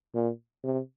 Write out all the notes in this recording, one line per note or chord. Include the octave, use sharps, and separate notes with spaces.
A#2
C3